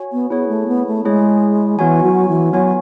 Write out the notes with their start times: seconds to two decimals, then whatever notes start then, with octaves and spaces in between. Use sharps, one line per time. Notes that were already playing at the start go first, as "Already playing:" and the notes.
Already playing: F#4 C#5 G#5
0.12 B3
0.30 B3 E4 G#4 C#5
0.49 A3
0.68 B3
0.87 A3
1.05 G#3 E4 G#4 C#5
1.79 E3 B3 F#4 C#5 G#5
2.03 F#3
2.28 E3
2.53 F#3 B3 F#4 C#5 G#5